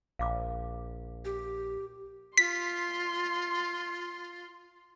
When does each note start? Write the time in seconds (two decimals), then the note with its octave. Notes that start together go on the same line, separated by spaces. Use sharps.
0.19 A#1 F5 D6
1.25 G4
2.38 F4 C6 B6